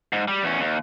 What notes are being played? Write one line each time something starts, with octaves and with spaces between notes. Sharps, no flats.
G#2
G3
E2 C#4
D#2